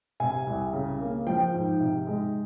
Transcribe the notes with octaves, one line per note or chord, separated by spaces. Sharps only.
C3 G#5
C2
C#3
A#3
F3 G5
G#2
C3
G#3